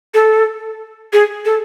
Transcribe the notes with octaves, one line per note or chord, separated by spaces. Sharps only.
A4
G#4
A4